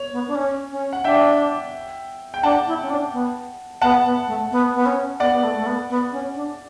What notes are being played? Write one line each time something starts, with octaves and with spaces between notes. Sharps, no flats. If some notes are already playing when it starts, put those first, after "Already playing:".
Already playing: C#5
B3
D4
C#4
C#4
F#5
D4 E5 G5
G5
D4 F#5 A5
E4
C#4
D4
B3
B3 F#5 A5
B3
A3
B3
B3
C#4
B3 D5 F#5
B3
A3
A3
B3
B3
C#4
D4